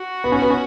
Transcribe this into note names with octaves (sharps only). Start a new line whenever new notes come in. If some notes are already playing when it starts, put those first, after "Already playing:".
Already playing: F#4
B3
C#4
B3
C#4